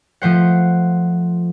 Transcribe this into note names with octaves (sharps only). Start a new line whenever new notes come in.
F3 A3 C5 F#5